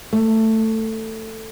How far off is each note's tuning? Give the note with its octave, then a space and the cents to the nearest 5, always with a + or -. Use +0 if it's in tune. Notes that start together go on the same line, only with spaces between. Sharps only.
A3 +10